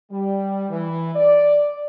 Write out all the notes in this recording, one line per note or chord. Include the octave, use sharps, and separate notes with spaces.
G3
E3
D5